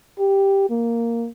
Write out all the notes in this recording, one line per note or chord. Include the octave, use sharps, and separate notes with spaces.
G4
A#3